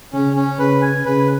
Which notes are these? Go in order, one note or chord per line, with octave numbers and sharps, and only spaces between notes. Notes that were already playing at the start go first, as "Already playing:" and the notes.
C#3 C#4
C#4
C#3 B4
G#5
C#3 B4